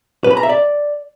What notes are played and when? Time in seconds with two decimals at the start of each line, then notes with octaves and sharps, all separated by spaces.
0.24 B4
0.31 B5
0.37 A#5
0.43 E5
0.49 D5